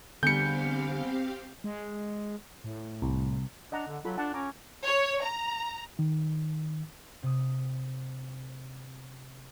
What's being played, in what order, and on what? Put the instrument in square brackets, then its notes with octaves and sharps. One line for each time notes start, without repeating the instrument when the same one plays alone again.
[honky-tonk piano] E2 G3 [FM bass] D3 [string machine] C4 G4 F5 [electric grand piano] G6 C#7
[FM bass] G#3
A2
[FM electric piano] C2
[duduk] D4 [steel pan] D#5 F#5 A#5
[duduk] D3
[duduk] F#3 [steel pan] F4 A4 B5
[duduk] D4 [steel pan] F#5 A5
[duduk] C#4 [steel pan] A#5 D6
[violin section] C#5
A#5
[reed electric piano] D#3
[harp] C3 D#6